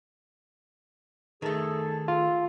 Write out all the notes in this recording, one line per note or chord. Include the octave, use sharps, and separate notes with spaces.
D#3 A3 G#4 A4
F4